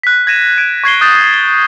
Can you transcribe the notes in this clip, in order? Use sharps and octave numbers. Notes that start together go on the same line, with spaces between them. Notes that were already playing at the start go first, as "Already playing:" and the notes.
F#6 B6
G#6 A#6 D#7 E7
G#6 D7 D#7
C#6 G#6 C7 G7
D#6 F#6 G6 A6 E7
G7